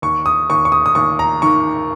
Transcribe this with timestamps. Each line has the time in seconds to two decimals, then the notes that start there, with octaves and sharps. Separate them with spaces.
0.02 D#2 C#6
0.26 D#6
0.50 D#2 C#6
0.65 C#6
0.72 D#6
0.86 D#6
0.95 D#2 C#6
1.19 A#5
1.42 D#3 C#6